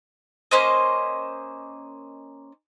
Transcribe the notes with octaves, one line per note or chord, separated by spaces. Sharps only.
A#3 C#4 C5 D#5